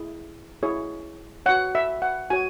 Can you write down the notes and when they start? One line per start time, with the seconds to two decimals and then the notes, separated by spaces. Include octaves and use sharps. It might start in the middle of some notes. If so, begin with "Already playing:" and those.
Already playing: E4 G#4
0.63 E4 G#4 C#5
1.46 F#4 C#5 F#5
1.75 E5
2.02 F#5
2.30 F#4 C#5 G#5